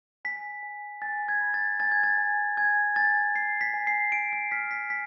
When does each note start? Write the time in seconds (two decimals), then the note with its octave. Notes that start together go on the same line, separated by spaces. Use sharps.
0.25 G#5 B6
0.63 G#5
1.02 G#5 A6
1.28 G#6
1.41 B5
1.54 A6
1.80 G#5 A6
1.92 G#6
2.04 A6
2.18 G#5
2.57 G#5 G#6
2.96 G#5 A6
3.35 G#5 C7
3.61 B6
3.74 G#5
3.87 C7
4.12 G#5 D7
4.33 C7
4.52 F6 B6
4.71 B6
4.90 G#5 B6